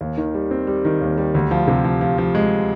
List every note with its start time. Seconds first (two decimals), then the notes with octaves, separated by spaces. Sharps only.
0.01 D#2
0.17 D#3
0.34 G3
0.51 C4
0.67 G3
0.85 D#3
1.01 D#2
1.18 G3
1.35 D2
1.51 F3
1.68 C3
1.84 F3
2.01 F3
2.18 F3
2.35 G#3